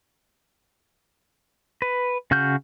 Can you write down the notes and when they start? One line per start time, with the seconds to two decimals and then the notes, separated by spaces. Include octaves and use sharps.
1.82 B4
2.31 C#3 F#4 F6 G6